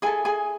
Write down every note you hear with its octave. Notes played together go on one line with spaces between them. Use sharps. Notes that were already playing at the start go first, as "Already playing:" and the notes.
E4 G#4 A4 G#5
G#4 G#5